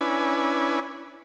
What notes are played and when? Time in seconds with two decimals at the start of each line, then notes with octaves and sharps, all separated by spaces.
0.01 C#4 D4 E4 B4 G#5